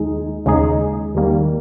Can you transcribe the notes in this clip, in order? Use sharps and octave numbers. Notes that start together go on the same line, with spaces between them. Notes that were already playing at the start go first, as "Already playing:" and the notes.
Already playing: D#2 G#3 D#4 G#4
D#2 C#3 G#3 D#4 G#4
D#2 D#3 G3 A#3